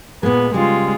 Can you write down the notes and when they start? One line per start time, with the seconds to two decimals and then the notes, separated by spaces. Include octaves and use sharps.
0.23 A#2 G#3 B3
0.54 C#3 G3 G#3 F4